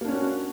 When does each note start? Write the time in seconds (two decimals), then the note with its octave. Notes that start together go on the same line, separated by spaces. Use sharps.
0.01 A#3
0.05 D4
0.08 C#4
0.12 F#4